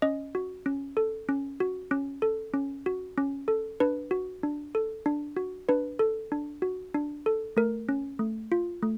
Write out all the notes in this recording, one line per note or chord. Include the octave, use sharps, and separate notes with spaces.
C#4 D#5
F#4
C#4
A4
C#4
F#4
C#4
A4
C#4
F#4
C#4
A4
D4 B4
F#4
D4
A4
D4
F#4
D4 B4
A4
D4
F#4
D4
A4
A3 A#4
C#4
A3
F4
A3